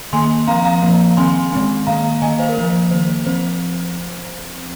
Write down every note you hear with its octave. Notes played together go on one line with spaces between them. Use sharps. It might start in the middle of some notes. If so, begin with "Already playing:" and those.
D#3 A#3 G#5 C6
F3 C4 F5 A#5
F5 A#5
F3 A#3
D#3 C4 G#5 C6
D#3 G#3 C4
D#3 A#3 F5 A#5
D#3 A#3 D#5 G#5
C5 F5
A#4
F3 A#3 C5
D#3 A#3 C5
F3 C4 C5